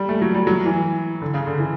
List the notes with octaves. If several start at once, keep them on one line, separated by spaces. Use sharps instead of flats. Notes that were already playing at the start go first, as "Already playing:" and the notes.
Already playing: G3
A3
F#3
G3
F#3
E3
D3
C#3
D3
E3